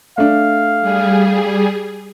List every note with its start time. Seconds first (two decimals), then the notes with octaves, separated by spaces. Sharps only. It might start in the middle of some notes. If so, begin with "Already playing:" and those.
0.18 A3 D4 F5
0.81 G3 G#4